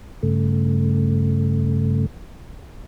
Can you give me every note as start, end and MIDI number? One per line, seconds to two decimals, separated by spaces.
0.23 2.06 43
0.23 2.06 49
0.23 2.06 57